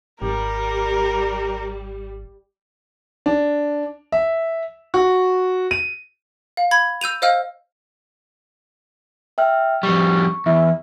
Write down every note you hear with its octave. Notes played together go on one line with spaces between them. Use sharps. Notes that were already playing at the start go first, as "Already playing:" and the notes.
G#1 G3 G4 A#4
D4
E5
F#4
D#7
F5
B5 G#6
E6 G6 D#7 F7
C5 D#5 F5 E6 F6
E5 G5 F6
F2 G3 C#6
E2 E4